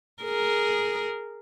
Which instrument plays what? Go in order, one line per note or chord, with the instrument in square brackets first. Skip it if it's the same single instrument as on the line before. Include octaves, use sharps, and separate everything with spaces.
[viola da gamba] G#4 A#4